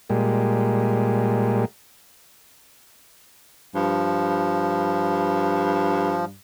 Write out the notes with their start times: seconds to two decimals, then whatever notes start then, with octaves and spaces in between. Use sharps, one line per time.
0.10 A#2 G3 G#3
3.75 G2 F3